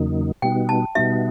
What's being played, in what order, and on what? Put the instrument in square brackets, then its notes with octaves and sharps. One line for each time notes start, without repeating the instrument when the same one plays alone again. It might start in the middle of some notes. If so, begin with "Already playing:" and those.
Already playing: [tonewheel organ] E2 C#3 F#3 A#3 D#4
[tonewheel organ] B2 G3 B3 D#4 F#4 [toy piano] G5
[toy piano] A5
[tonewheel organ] B2 G3 B3 D#4 F#4 [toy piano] E5